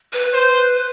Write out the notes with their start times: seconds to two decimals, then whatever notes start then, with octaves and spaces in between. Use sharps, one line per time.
0.13 B4
0.34 C5